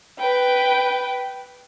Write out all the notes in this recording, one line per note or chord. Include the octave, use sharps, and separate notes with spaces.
B4 G5